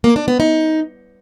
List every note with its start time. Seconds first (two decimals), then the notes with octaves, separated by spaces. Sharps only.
0.04 A#3
0.16 D4
0.28 B3
0.40 D#4